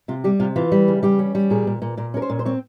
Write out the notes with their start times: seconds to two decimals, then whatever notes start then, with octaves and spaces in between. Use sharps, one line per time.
0.08 C3 F4
0.24 G3 G4
0.40 C3 F4
0.56 E3 F4
0.72 G3
0.88 C#3
1.03 G3 G4
1.19 C#4
1.35 G3
1.50 A#2 G#4
1.67 A#2
1.82 A#2
1.97 A#2 A#4
2.14 C#4 A#4
2.22 C5
2.30 A#2
2.39 C5
2.45 C4 C#5